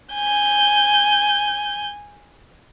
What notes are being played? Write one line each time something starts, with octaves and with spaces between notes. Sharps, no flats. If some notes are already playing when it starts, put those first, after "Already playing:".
G#5 G6